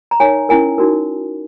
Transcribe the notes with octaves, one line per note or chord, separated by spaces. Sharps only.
A#5
D#4 A#4 C#5 G#5
C#4 E4 A#4 G#5
D#4 F#4 A#4